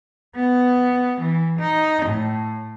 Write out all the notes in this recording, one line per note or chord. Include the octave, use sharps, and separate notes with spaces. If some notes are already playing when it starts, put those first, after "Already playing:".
B3
E3
D#4
A2